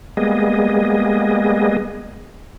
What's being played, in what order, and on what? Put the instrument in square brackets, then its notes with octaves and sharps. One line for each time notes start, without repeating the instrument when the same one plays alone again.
[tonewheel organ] G3 G#3 A#3 B3 G#4 D#5